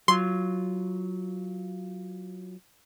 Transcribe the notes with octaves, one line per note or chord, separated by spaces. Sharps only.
F#3 F4 C6